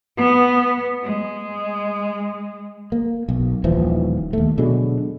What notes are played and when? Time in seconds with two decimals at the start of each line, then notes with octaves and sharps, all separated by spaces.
0.17 B3
1.03 G#3
2.92 A#3
3.29 B1
3.64 D#1 D#2 E3 F3
4.33 D#2 A3
4.58 B2 D3 F#3 G#3